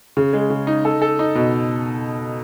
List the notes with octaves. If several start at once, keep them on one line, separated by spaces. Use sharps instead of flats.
C#3
G#3
C#3
D#4
A4
A4
D#4
B2